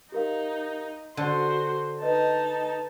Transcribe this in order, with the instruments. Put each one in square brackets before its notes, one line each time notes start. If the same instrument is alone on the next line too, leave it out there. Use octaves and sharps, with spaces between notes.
[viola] D#4 [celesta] G4 A#4 F5
[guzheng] D3 [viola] F#4 C5 [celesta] D5 A5 D#7
[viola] D#4 A5 [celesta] B4 D#5